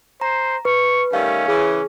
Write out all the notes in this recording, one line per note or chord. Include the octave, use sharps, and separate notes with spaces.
C5 A#5
B4 C#6
D#3 G3 A3 C#4 F5
C#3 E3 G#4